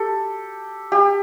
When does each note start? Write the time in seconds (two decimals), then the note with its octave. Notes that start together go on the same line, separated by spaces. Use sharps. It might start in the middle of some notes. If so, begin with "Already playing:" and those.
Already playing: G4 A4
0.92 G4